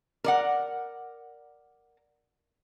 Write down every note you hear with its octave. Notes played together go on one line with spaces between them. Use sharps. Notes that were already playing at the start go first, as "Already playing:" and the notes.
A#4 D5 F#5